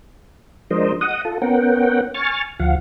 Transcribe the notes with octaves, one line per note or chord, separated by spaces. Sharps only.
F3 G#3 D4 A#4 C5 D#5
D#5 F#5 D#6
F4 A4
B3 C#4 A#4 F#5 G5
G#5 C#6 F6 A6
D2 F3 F5 F#5